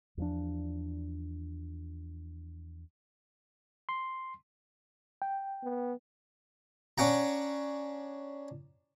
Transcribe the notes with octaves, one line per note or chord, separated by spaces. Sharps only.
E2 F3 D4
C6
G5
B3
C#4 D4 F#5 A#5